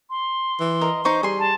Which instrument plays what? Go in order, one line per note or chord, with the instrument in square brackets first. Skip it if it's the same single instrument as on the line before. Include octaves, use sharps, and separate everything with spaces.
[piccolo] C6
[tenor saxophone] E3
[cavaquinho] A#4 D#5
[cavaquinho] D#4 C#6 [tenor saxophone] C5
[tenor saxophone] G3 [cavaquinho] G#4 C6
[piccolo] A5